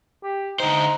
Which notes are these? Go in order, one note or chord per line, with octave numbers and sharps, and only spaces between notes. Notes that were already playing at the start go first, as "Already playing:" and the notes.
G4
D3 D#4 C5